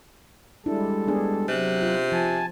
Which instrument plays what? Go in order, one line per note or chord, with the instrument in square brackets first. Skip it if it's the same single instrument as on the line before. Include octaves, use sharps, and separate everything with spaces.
[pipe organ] G3 G#3 A4 [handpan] D4 E4
[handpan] B3 D4 G#4
[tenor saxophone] C3 [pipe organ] F#3 F#6
[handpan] F4
[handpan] F3 [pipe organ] G#5 A5